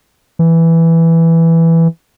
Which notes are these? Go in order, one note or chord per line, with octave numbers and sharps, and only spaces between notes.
E3